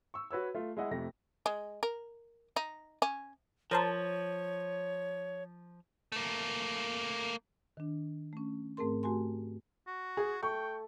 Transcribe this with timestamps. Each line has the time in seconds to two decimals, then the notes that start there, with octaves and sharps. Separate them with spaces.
0.14 C#6 E6
0.31 F#4 B4 C#5 E6
0.55 A3 F4
0.77 G#3 E4 D#5 F#5
0.91 F2 C3 A3 A#6
1.46 G#3
1.83 A#4
2.56 D#4
3.02 C#4
3.71 F3 A#4 C5 C#5 A5
6.12 A3 A#3
7.77 D#3 D4
8.33 A3 C#4
8.77 G#2 A3 C4 G#4 A#4 C6
9.03 A3 F#4 G4 G#5 C6
9.87 F#4
10.17 G#4
10.43 A3 G5 C#6